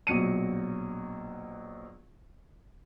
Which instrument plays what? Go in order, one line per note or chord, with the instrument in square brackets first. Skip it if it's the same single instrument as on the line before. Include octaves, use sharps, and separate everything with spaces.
[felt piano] A#1 B2 F#3 C#7 D#7